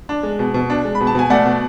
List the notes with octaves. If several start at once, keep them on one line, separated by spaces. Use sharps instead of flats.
D4
G#3
B2
B2
D4
G#3
B5
B2
A5
B2 G#5
A3 D5 F#5
B2